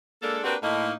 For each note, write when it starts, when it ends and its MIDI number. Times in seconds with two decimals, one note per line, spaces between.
0.23 0.41 56
0.23 0.41 58
0.23 0.41 62
0.23 0.41 69
0.44 0.55 58
0.44 0.55 60
0.44 0.55 62
0.44 0.55 66
0.44 0.55 67
0.44 0.55 71
0.63 0.93 45
0.63 0.93 58
0.63 0.93 63